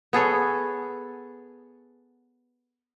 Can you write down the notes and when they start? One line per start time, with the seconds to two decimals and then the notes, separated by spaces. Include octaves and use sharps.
0.13 B3 G#4 A4 C#5